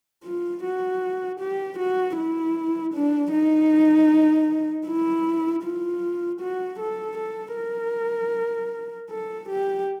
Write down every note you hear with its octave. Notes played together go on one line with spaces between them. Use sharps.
F4
F#4
G4
F#4
E4
D4
D#4
E4
F4
F#4
A4
A4
A#4
A4
G4